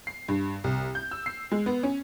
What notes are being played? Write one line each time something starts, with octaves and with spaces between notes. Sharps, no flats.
C7
G2
C2
G6
E6
C7
G#3
B3
C#4